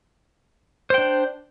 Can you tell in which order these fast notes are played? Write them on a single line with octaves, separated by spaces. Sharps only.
C5 G5 D4